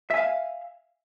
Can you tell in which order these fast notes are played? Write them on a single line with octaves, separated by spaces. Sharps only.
E5 G#5 F5